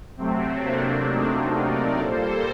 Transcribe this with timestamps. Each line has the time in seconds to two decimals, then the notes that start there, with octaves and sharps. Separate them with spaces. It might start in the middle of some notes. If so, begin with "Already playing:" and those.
0.17 C3 F#3 A3 C4
0.63 A#3 D4
1.08 C4 D#4
1.54 A#4 D5
1.99 A#2 G3 A#3 A4 C5